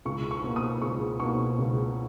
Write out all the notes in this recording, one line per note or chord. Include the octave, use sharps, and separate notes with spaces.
C#2 C#6
C#6
B2 A#3
D#6
C#2 C#6
B2 A#3 C#6
C#2